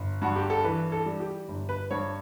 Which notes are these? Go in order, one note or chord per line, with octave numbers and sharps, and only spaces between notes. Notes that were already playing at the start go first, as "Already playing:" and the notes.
Already playing: G1
G2 F#4
G4
A4
E3 B4
A4
G3
G4
G1
B4
G2 C#5